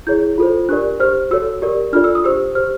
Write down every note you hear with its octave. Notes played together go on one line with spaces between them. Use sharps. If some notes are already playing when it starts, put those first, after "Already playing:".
E4 G#4 C#5 G6
F4 A4 C5
D4 G4 A#4 D5 F#6
G4 C5 F6
F#4 A4 C#5 E6
G4 A#4 D5
D4 F4 A4 D5 F6
E6
D#6
G4 C5 E6
G4 C5 F6